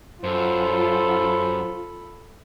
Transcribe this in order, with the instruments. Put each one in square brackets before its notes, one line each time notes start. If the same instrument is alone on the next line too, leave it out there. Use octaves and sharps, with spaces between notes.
[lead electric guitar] F#2 [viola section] F4 [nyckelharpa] A4 B5 [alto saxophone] C5